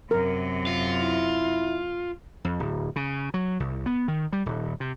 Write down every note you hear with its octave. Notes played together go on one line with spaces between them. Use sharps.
F#2 C3 A#4
F4
E4
F2
D1
C#3
F#3
C2
B3
D#3
G3
D#1
C3